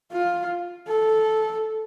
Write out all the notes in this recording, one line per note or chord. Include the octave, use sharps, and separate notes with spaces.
F4
A4